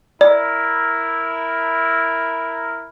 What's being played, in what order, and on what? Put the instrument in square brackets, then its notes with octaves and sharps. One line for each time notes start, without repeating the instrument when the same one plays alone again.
[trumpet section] E4 A#4 [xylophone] D5